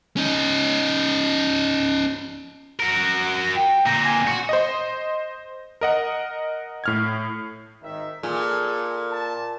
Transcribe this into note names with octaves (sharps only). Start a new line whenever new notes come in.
C#4 D#4
F#4 A#4
G5
A#2 C4 A#5
G#5
F#4
C5 D#5
A#4 D#5 F#5
A2 F6 G#6
G#1 D#3 E5
A#2 G#4 A4
A5